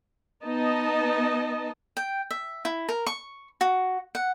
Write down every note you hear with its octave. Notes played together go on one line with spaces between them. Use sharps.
B3 D#4 D#5 A5
G5
E5
E4
A#4
C#6
F#4
F#5